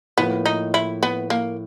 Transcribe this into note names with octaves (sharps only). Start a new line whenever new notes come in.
A2 F3 A#3 B3
D#4
E4
B3
A#3